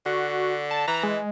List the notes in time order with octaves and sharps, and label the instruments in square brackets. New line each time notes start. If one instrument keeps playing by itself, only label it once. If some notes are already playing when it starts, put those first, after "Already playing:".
[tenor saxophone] D3 [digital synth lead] F#4
[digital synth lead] A5
[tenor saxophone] E3 [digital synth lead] A#5
[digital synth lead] G#3